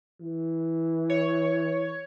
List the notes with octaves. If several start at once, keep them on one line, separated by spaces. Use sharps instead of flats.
E3
C#5